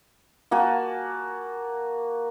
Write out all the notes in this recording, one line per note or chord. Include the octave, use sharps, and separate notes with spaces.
A#3 F#4 G#5 A5